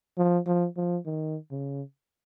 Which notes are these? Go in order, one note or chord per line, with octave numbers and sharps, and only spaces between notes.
F3
F3
F3
D#3
C#3